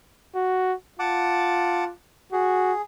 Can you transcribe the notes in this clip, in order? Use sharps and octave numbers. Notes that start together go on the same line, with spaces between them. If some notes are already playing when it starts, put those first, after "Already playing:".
F#4
F4 F#5 A5 D6
F#4 G#4